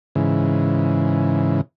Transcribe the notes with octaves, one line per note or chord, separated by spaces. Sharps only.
G#2 C#3 E3